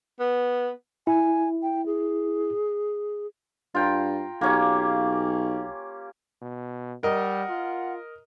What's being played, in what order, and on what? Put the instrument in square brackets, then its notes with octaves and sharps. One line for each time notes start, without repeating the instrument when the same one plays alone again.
[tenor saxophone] B3
[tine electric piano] E4 [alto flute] G#5
[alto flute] G5
G#4
[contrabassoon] G2 [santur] F4 G5 A#5
[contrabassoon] B1 [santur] A#3 C#4 G4
[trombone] B2
[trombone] G3 [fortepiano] A#4 D#5 [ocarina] F#5
[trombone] F4